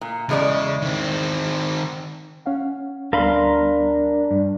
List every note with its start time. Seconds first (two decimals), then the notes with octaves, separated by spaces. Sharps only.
0.01 A#2
0.29 E2 C#3 G#3 D5
0.82 D#3 C4
2.46 C#4 F5 F#5
3.13 D2 G3 B3 D4 A#4 F5 B5 C6
4.31 G2